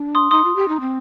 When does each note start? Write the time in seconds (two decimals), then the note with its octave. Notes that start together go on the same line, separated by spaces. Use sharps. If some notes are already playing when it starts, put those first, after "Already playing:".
Already playing: D4
0.15 C6 D#6
0.31 D#4 C6 D#6
0.44 F4
0.56 G4
0.68 D#4
0.80 C4